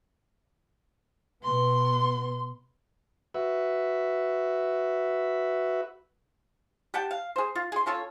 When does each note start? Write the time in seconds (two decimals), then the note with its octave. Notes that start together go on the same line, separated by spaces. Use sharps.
1.44 B2 B3 C6
3.34 F#4 B4 E5
6.94 G4 F#5 G5 A5
7.11 F5
7.36 G#4 C5
7.55 F4
7.72 G#4 C6
7.86 C#4 F4 A4 C#5